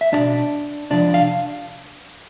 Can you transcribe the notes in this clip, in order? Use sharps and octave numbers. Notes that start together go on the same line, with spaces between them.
E5
C2 B2 D4 D5
F2 C3 F3 D4 D5
F5